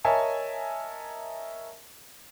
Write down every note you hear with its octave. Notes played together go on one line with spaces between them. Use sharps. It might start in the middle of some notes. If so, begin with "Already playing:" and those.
A#4 C#5 D#5 E5 G#5 A5